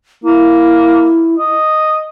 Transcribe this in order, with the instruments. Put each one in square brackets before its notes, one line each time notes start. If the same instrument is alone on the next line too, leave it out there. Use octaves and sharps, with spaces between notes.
[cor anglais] A#3 [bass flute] E4
[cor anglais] D#5